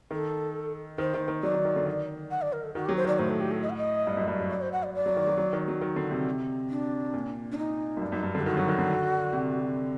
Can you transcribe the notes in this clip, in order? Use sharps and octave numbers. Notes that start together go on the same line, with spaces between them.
D#3 A4
D#3 C5
D#3
D#3
F#3 D5
D#3
D#3
D3
D#3
F#5
D5
A#4
A4
D#3 F#4
G4
F#3
C5
D#3 D5
A2 C5
A4
G4
A4
D#5
F#5
D#5
G2
F#2
G2
F#3
D5
C5
F#5
D5
D5
F#3
D#3
F#3
F#3
D#3
F#3
D#3
D3
C3
D4
A#2
D4
D#4
F#2
G2
F#2
G2
D3 G4
D#3 F#4
F#3
D#3
D3
C3